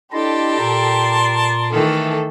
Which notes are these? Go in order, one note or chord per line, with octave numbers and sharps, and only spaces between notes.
D4 E4 G4 A4 D5 D#5 A5 C6
A#2 A#4
D#3 E3 A3 A4